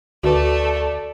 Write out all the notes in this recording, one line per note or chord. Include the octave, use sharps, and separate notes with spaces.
D2 A3 F#4 B4 D5